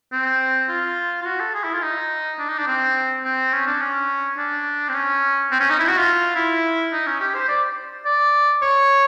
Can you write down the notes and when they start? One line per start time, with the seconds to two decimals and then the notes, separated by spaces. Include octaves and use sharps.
0.13 C4
0.69 F4
1.22 F4
1.26 F#4
1.40 A4
1.54 G#4
1.64 E4
1.73 F4
1.83 D#4
2.39 D4
2.49 D#4
2.58 D4
2.67 C4
3.24 C4
3.53 C#4
3.67 D4
3.81 C#4
4.38 D4
4.89 C4
4.94 C#4
5.51 C4
5.60 C#4
5.70 D#4
5.79 E4
5.89 F#4
5.98 F4
6.36 E4
6.92 D#4
7.07 C#4
7.21 G4
7.35 C5
7.49 D5
8.06 D5
8.62 C#5